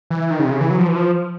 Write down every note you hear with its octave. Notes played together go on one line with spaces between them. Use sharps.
E3
D#3
C#3
C3
C#3
E3
F#3
F3
E3
F3